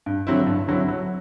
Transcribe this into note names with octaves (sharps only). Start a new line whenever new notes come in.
G2
D3 F#3 C4 E4
G2
D3 F#3 C4 E4
F#3